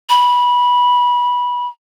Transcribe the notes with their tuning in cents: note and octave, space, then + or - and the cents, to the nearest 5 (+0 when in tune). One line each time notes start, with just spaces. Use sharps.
B5 -15